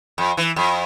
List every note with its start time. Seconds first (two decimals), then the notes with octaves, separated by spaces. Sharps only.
0.18 F2
0.37 E3
0.56 F2